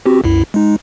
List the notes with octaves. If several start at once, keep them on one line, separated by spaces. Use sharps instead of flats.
C4 F#4 G4
C2 F#2 E4
G#3 D#4